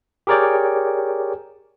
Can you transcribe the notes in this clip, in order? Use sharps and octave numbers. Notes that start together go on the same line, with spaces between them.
G4 G#4 A#4 C#5 D5 G5